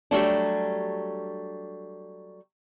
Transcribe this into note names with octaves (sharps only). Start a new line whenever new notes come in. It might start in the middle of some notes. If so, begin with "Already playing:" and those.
F#3 G3 A3 D4